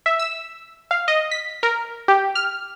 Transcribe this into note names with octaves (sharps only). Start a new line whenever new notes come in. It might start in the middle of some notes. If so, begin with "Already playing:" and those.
E5
E6
F5
D#5
B6
A#4
G4
F6